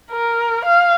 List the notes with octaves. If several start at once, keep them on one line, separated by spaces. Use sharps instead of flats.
A#4
F5